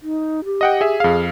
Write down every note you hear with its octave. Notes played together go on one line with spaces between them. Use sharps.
D#4
G4
D#5 F#5 G5
G#4 E5
F2 G#4 F5